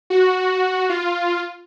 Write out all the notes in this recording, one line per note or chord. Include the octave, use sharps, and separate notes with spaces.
F#4
F4